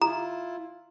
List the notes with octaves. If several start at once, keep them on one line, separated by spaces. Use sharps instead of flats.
E4 F4 A#5